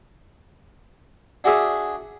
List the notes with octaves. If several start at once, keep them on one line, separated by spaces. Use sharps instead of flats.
D4 F#4 G#4 E5